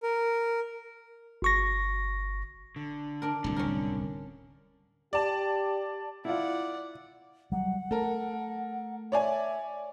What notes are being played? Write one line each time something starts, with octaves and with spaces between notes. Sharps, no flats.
A#4
G1 C#6 A#6
D3
D4 A#4
D1 C2 D3
C#4 A#4
G4 D5 A5
E4 F4 D5 F#5
F#3 G3 F#5
A3 A4 A#4
C#5 D5 E5 G#5